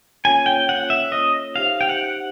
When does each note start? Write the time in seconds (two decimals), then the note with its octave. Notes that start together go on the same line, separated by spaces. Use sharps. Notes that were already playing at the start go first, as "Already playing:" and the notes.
0.25 A#3 C#4 F4 A4 C#5 G#5
0.46 G5
0.69 F#5
0.90 E5
1.12 D#5
1.56 D#4 G4 C5 E5 F5
1.81 G5
1.89 F#5